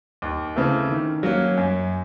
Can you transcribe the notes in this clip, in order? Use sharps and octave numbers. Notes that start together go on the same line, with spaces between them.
D#2
C#3 E3 A3 C4
D#3
F#3 A#3 C#4
F#2